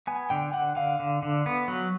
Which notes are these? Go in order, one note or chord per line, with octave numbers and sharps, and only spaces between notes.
B3 G#5
D3 G5
D3 F#5
D3 F5
D3
D3
B3
F#3